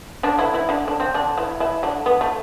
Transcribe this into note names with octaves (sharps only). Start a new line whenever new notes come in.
D3 D4
E3 E4
E3 E4
D3 D4
D4
C4
D3 D4
E3 E4
E3 E4
D3 D4
B3
A3